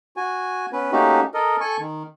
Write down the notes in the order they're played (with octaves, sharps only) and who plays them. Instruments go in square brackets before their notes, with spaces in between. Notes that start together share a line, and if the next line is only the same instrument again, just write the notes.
[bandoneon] F#4 G#5
B3 C#4 B4
A3 A#3 C#4 D#4 F#4 G4
A4 A#4 D#5
A4 G#5 C#6
D#3